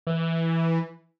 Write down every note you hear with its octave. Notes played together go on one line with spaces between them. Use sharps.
E3